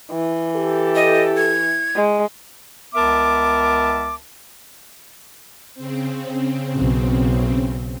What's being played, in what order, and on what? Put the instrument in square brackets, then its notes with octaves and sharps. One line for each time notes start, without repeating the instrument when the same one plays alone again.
[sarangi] E3
[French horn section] G4 A4
[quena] D#5
G#6
[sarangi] G#3
[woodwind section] C#2 B3 A#4 E5 A5 D6
[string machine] C#3 C4
[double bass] B1